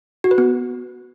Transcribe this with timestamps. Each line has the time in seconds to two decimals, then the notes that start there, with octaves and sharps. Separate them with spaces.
0.24 F#4
0.31 B4
0.38 B3